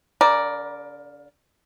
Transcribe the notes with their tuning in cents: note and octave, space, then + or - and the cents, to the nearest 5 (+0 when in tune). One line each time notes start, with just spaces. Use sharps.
D3 -45 A#4 +10 D5 +0